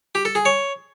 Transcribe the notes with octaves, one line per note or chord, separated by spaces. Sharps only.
G4
A4
G#4
C#5